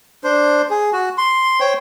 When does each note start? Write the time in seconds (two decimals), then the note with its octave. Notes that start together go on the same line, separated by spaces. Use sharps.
0.24 D4 C5
0.70 G#4
0.93 F#4
1.18 C6
1.60 C5 C#5 G5